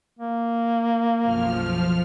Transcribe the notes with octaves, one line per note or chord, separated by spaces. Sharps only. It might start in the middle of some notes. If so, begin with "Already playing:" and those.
A#3
B1 F#2 F3 F6